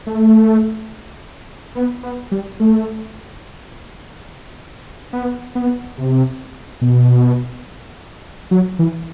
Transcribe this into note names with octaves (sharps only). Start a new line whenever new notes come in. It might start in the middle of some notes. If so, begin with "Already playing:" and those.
A3
B3
B3
G3
A3
B3
B3
C3
B2
F#3
E3